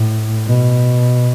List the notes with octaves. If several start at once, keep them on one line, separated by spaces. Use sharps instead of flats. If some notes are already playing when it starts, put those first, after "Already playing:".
Already playing: A2
B2